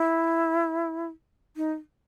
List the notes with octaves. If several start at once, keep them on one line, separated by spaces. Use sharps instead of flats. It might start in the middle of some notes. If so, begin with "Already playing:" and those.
Already playing: E4
D#4